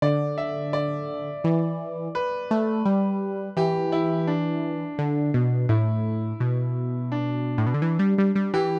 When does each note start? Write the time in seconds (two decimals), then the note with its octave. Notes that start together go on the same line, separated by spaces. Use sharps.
0.02 D3 D5
0.38 E5
0.73 D5
1.44 E3
2.15 B4
2.51 A3
2.85 G3
3.57 E3 G4
3.92 E4
4.27 D4
4.99 D3
5.34 B2
5.69 A2 E4
6.40 B2
7.12 D4
7.58 A2
7.67 B2
7.74 D3
7.82 E3
7.99 G3
8.18 G3
8.36 G3
8.54 E3 G4